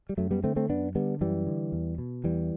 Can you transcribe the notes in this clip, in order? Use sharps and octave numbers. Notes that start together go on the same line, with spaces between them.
G3
F#2 F#3 A3
G3 B3
D3 A3 C4
A3 C4
F#2 B3 D4
D3 G3 B3
F#2 E3 G3
D3
E2
B2
E2 E3 G3